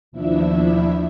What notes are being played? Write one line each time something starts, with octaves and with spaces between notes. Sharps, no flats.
D#2 B2 F3 D4 E4 E5